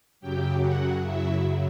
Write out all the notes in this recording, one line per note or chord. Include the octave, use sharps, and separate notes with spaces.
F#2 C#3 F#3 G4 G5
F#4 F#5
E4 E5